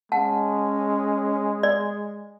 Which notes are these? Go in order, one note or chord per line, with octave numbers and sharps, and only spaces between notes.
G#3 C#4 F#5 A5
D5